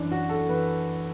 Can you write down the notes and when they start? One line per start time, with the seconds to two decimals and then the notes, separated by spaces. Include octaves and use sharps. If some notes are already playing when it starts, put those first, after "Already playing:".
Already playing: F#2 E3 D4
0.11 F#4
0.29 A4
0.49 E3 B4